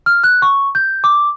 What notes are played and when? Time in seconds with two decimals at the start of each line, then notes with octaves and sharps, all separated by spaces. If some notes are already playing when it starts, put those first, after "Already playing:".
0.06 F6
0.24 F#6
0.42 C#6
0.75 G6
1.04 D6